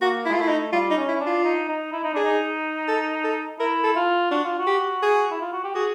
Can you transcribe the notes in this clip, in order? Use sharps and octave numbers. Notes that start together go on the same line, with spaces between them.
A#3 F#4
E4
G#3
F4
A3 E4
D#4
G3 F4
D#4
C#4
E4
D4
F4
D#4
D#4
E4
D#4
D4 G#4
D#4
A4
A4
E4 A#4
A4
F4
D4 F#4
F4
F#4
G4
G#4
E4
F4
F#4
G4
F#4 G#4